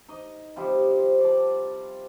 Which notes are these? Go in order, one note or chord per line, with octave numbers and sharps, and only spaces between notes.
D#4 D#5
C3 F3 G3 G4
C5
D5 A5